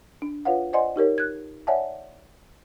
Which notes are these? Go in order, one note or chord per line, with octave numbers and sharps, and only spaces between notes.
D4
F4 B4 C#5 F5 F#5
C5 D5 D#5 F#5 G#5 C6
D#4 G4 A#4 C#5
F#6 G#6
C#5 D5 E5 F#5 G#5 A5